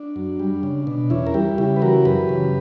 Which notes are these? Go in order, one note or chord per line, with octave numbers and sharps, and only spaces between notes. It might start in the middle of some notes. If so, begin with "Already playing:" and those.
Already playing: D4
F#2
G3
C#3
B2 D4
E2 C#4 E4
A#4
G3 E4 G4
C#3 E4 G4
B4
E3 F#4 A#4
F#2 G4 B4
C#3